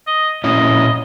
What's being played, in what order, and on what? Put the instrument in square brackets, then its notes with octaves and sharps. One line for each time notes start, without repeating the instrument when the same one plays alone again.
[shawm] D#5
[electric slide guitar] A#2 C#4 E4 [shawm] D#5